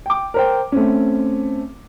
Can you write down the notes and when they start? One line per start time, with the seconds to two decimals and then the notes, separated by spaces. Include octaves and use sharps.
0.06 G5 D6
0.34 A#4 C5 G5
0.72 A3 C4 C#4